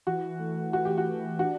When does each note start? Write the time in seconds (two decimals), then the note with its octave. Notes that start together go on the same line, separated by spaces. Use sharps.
0.07 E3 F#4
0.39 A3
0.73 E3 F#4
0.85 G4
0.98 F#4
1.06 E3
1.39 D4 F#4